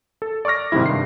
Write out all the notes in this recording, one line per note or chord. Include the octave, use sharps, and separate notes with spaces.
A4
D5 C#6 D6 F6 A#6
G#2 C3 D#3 G3 E4
G2 C7